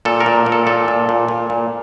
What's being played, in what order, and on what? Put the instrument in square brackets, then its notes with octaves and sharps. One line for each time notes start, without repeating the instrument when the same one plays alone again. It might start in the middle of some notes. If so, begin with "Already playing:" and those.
[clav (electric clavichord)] A#2 A4
A#4
A#2
A#2
A4
A#2 A4
A#2
A#2
A#2
A#2